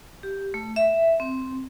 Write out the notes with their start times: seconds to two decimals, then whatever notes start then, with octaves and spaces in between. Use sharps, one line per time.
0.23 G4
0.54 A3
0.76 E5
1.20 C4